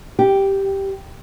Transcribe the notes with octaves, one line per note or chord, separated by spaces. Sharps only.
G4